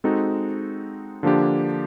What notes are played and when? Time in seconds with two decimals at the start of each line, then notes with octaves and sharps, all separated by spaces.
0.04 G#3 C4 D#4 F#4 A4
1.23 D3 F3 A#3 D4 G4